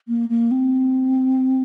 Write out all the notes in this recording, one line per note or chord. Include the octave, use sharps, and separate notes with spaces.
A#3
A#3
C4